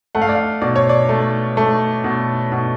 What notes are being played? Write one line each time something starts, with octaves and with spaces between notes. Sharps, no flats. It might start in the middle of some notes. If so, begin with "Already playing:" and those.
A3 F#5
F5
D5
F5
B2 D5
C#5
D5
A3
A3
B2
B2